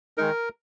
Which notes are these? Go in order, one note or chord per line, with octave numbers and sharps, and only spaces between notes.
D#3 G#3 D#4 A#4